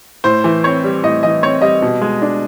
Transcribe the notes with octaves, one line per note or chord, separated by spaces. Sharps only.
A2 C5
E3
C4 C#5
G3
A2 D#5
E3 D#5
C4 C#5
G3 D#5
B2
G#3
D4